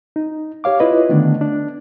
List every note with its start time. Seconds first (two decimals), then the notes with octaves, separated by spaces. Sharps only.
0.16 D#4
0.64 G4 C#5 F5 D6
0.80 E4 F4 B4 D#5
1.09 D3 D#3 A3 B3 D4
1.41 D4